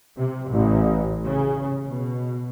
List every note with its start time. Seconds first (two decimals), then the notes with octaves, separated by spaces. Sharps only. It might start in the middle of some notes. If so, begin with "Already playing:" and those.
0.17 C3
0.50 A1
1.26 C#3
1.89 B2